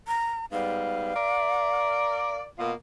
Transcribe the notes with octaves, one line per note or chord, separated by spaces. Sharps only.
A#5
G#2 G3 B3 F5
A#4 D5
B2 A#3 F4